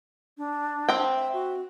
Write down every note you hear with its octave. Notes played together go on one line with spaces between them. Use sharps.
D4
C4 G5
E5
F#4